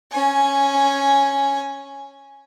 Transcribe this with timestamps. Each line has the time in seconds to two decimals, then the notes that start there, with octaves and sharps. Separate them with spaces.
0.12 C#4 G#5